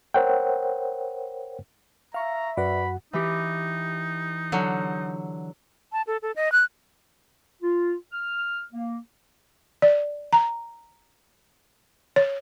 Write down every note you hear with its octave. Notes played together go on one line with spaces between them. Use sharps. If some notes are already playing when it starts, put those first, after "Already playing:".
A#4 C5 C#5 F#5 G5
E5 F5 A#5 C#6
F#2 F#4 B4 D5 F#5 B5
E3 D#4 G4
D3 F#3
A5
A4
A4
D#5
F#6
F4
F6
A#3
D5
A#5
C#5